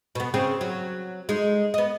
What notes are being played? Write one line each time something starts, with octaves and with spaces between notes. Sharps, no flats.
B2 B3
C#3 C4 G#4
F#3
G#3 D#4
B3 D#5